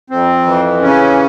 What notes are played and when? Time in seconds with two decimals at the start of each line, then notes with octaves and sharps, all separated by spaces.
0.10 F2 C4
0.46 E3
0.82 C#3 C#4